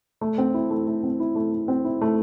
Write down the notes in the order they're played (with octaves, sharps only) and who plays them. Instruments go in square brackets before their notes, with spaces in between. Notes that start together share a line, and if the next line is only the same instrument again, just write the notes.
[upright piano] A3
C4
E4
A3
A3
C4
E4
A3
A3
C4
E4
A3